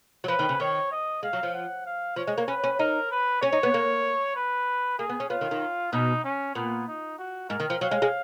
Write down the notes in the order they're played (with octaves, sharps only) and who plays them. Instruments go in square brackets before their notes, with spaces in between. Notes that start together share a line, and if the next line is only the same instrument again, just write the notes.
[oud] F#3
[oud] F3 [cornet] B4
[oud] D#3
C#3
[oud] D#3 [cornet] C#5
[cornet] D#5
[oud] G#3 [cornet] F5
[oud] F#3
F3
[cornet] F#5
F5
[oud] F3 [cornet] C#5
[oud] G#3
A#3
[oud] C#4 [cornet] B4
[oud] C#4
[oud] D#4 [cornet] A#4
[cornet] B4
[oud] C#4 [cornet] C#5
[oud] D#4
B3
A#3
[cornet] B4
[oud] A#3 [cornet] G#4
[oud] B3
C#4
[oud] B3 [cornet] F4
[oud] D#3
D#3
[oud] B2 [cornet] D#4
[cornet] C#4
[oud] A#2 [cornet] B3
[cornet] D#4
F#4
[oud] G#2 [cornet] A#4
[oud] D#3
F3
[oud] F#3 [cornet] F5
[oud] G#3
G#3